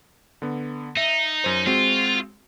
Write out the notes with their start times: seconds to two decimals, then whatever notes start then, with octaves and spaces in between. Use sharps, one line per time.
0.42 D3 B3
0.97 D#4 E5
1.44 F#2 C5
1.66 G#3 C4 F4 F#4